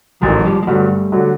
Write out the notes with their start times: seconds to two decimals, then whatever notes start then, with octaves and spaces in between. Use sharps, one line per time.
0.22 A1 G#2 D#3 F#3 G#3
0.44 F3 G3
0.63 G#3
0.67 G2 D3 F#3 G3 A3
1.12 D3 F#3